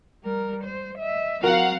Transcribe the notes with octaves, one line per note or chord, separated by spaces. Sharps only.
G3 A#4
C5
D#5 E5
F#3 C4 F#4 A#4 F5 F#5